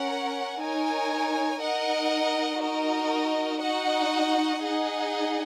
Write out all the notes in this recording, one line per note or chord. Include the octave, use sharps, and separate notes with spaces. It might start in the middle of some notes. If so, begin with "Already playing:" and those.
Already playing: C#4 A#4 F#5
D#4 A#4 C#5 G#5
D#4 A#4 D#5 F#5
D#4 F#4 A#4 D#5
D#4 F#4 D#5 F#5
D#4 G#4 D#5 F#5